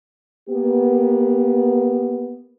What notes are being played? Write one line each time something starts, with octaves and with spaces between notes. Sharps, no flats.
A#3 B3 G4